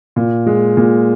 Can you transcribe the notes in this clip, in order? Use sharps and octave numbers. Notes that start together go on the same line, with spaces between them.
A#2
G#3
A#2